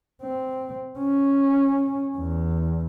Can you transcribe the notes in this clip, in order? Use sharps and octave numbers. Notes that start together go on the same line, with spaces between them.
C4
C#4
E2